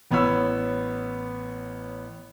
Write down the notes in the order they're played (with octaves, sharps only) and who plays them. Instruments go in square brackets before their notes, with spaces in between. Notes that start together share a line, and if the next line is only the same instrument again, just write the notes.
[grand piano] A1 B3 C#5 B5 E6